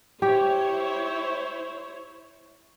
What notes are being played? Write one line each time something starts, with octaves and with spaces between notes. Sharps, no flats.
E4 G4 C5 C#5